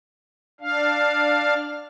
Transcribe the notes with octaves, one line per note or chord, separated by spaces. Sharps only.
D4 F5